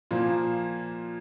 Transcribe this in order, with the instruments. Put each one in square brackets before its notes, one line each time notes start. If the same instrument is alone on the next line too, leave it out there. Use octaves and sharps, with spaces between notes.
[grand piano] A#2 F3 A#3